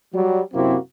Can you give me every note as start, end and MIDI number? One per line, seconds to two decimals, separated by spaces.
0.14 0.41 54
0.14 0.41 55
0.54 0.77 42
0.54 0.77 48
0.54 0.77 58
0.54 0.77 60
0.54 0.77 64
0.54 0.77 66